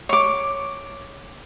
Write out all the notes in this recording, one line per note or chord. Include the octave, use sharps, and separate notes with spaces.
C#5 D6